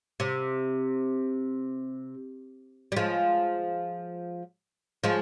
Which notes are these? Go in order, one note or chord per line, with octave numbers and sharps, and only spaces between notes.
C3
G3
F3 G#3
F3 G#3